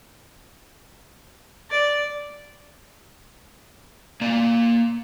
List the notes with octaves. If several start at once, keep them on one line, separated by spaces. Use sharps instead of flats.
D5
A#3 D5